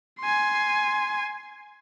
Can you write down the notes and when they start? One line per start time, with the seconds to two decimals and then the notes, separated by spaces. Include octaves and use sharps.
0.20 G#5 C6